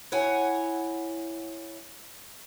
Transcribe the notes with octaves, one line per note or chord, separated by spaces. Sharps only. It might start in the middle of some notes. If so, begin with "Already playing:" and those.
E4 C#5 F#5 G#5